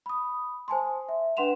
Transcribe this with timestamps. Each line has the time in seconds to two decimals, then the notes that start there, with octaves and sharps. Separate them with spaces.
0.06 B5 D#6
0.68 C5 G#5 A5 C6
1.09 E5
1.37 D4 B4 F#5 C6 E7 F7